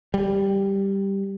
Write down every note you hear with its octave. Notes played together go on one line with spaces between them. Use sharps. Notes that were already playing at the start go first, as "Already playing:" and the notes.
G3